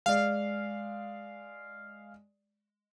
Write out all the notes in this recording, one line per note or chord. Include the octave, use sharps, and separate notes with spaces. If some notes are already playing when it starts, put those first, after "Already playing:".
G#3 D5 F5